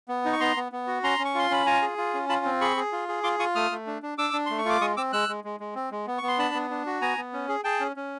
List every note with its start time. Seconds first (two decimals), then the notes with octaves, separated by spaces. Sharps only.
0.08 B3
0.25 D#4
0.33 C#6
0.40 B3 A#5 C6
0.57 B3
0.72 B3
0.87 F#4
1.03 C#4 A#5 C6
1.19 C#4
1.25 C#6
1.35 F4 C6
1.50 C#4 B5
1.66 F4 G#5 A#5
1.82 G#4
1.98 F4
2.14 C#4
2.29 F4 A5 B5
2.45 C4
2.61 G#4 B5 C#6
2.77 G#4
2.92 F4
3.08 G#4
3.24 F4 C6 D6
3.39 F4 C#6 D#6
3.55 A3 D#6 F6
3.71 A3
3.87 D4
4.02 D4
4.18 D4 D6 E6
4.33 D4
4.46 A3 C6
4.58 C#6
4.65 F4 D6
4.81 G#3 C#6 D#6
4.97 C4 D6 E6
5.13 G#3 E6 F#6
5.29 G#3
5.44 G#3
5.60 G#3
5.75 C4
5.92 G#3
6.07 B3
6.18 B3 C#6
6.28 C6
6.38 D4 A5 B5
6.54 B3
6.70 D4
6.86 F#4
7.01 B3 G#5 A#5
7.18 B3
7.33 C#4
7.49 G#4
7.64 G#4 G5 A5
7.80 C#4
7.96 C#4